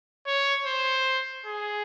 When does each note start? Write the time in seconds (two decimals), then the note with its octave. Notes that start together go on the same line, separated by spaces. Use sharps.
0.27 C#5
0.66 C5
1.46 G#4